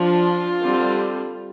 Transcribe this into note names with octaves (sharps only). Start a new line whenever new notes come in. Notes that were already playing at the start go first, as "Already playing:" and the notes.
Already playing: F3 D4 F4
D3 G3 C4